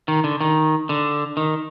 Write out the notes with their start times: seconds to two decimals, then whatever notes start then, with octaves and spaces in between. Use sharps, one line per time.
0.08 D#3
0.24 D3
0.41 D#3
0.89 D3
1.37 D#3